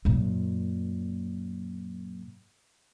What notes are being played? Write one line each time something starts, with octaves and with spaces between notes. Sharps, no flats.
F#2 A#2